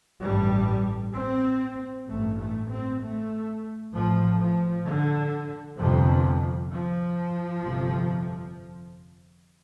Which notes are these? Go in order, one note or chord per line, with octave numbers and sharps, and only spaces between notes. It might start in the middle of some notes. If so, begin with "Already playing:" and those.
A1 G2 G3
C4
A1 G2 A3
A3
C4
A3
A1 A2 F3
F3
D3
G1 F2 C3 F3
F3
G1 F2 C3